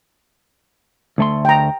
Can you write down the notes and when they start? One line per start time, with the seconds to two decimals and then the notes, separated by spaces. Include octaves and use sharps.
1.18 D2 A3 C6
1.45 G5 A#5